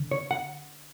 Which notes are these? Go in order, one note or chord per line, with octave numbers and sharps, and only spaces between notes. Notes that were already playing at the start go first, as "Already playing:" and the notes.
Already playing: D3
C#5
F#5